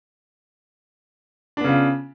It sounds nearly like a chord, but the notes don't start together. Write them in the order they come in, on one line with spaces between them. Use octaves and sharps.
D4 B3 C#3 F4